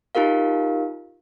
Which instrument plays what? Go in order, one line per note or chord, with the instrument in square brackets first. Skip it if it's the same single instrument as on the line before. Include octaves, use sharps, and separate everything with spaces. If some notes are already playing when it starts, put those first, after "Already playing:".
[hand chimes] D#4 F4 G4 A#4 F5